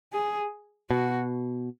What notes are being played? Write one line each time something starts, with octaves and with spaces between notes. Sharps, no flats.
G#4
B2 F#4